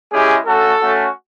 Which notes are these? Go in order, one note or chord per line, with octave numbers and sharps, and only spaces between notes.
G#3 C#4 E4 G4 G#4
A3 C#4 F#4 A4
A3 C#4 F#4